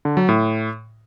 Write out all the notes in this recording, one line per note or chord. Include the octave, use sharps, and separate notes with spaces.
D3
F#3
A2